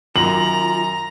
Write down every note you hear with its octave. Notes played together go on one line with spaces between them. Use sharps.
F#2 D#3 F4 A#5 F#7